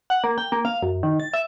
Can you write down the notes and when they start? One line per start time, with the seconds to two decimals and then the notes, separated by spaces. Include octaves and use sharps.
0.10 F#5
0.24 A#3
0.38 G5
0.52 A#3
0.65 F5
0.83 F#2
1.03 D#3
1.20 A6
1.33 E5